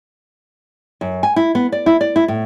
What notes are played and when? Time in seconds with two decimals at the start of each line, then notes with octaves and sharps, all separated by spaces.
1.01 F#2
1.23 G#5
1.36 E4
1.55 B3
1.72 D5
1.86 E4
2.01 D5
2.16 E4
2.28 A2